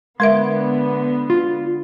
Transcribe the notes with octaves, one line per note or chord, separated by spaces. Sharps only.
D3 G#3 B3 A#4 E5 C6
F4